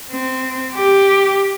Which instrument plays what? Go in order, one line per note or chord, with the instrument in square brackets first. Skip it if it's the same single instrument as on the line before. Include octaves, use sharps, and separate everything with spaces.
[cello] C4
G4